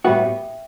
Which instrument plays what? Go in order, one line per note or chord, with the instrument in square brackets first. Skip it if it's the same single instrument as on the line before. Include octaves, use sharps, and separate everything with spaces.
[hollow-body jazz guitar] A2 G3 B3 F#4 [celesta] E5 G5